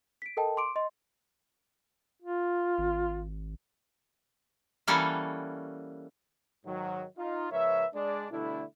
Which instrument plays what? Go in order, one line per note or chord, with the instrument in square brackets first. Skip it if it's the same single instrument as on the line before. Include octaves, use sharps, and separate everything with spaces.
[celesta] B6 D7
A4 A#4 D#5 G5 A5
C6 D6 D7
D#5 C6
[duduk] F4
[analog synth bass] G#1
[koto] E3 G3 A#3 C#4 F#4 A4
[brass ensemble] G#2 D#3 F#3
D#4 F4
C#2 F3 A#4 B4 C#5 E5
G#3 D4 D5
B2 D3 G3 A3 D4 E4